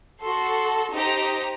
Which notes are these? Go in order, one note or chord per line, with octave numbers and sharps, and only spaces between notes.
F#4 A4 C6
D#4 G4 C5 A#5